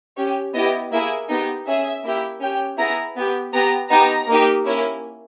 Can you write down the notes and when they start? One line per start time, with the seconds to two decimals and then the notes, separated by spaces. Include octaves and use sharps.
0.17 C#4 G4 C#5
0.54 B3 E4 G4 D#5
0.92 A#3 E4 G#4 E5
1.29 B3 D#4 G4 G5
1.66 C#4 G#4 E5
2.04 A#3 E4 G4
2.41 C#4 G4 G5
2.78 B3 E4 G#4 A#5
3.16 B3 G4
3.53 B3 G4 A#5
3.90 B3 D#4 G4 A#5
4.28 A#3 D#4 G4
4.65 A#3 C#4 E4